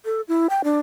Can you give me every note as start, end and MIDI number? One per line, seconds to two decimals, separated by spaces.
0.05 0.21 69
0.28 0.47 64
0.50 0.62 79
0.64 0.79 62